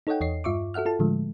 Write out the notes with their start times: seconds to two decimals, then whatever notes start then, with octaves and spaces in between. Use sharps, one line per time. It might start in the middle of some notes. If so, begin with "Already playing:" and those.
0.07 D#4 A4 C#5 D#5 F#5 G5
0.21 E2 C#5 D#5 C7
0.44 G2 F4 E5 C#6 D6
0.74 F#4 A4 E5 F#5 F6
0.86 F4 A4 A5
0.99 A2 D3 F3 G#3 A3